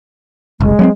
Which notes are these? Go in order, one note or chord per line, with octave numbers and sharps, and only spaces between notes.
F#1 C2 G#3
F#3 B3 C4